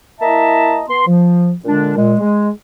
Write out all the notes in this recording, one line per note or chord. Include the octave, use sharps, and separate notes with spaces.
A#3 E4 D#5 E5 A5 A#5
B3 C6
F3
A#2 D3 G#3 D4
A#2 G#3
G#3